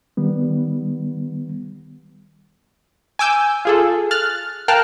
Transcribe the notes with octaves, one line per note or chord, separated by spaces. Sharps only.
D#3 G3 B3
G#5 D6 E6 G6
F4 G#4 A4
F6 F#6 A6
A#4 F5 G5 A5 F6 F#6